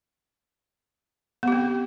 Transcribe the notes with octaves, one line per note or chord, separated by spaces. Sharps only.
B3 C4 G4